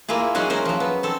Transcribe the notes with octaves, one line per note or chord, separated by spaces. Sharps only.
A#3 E4 F4 G#4
F#3 G#3 C#4 F#4 G#4
C#4 A#4 C5
F3 F#3
B3
C4 A4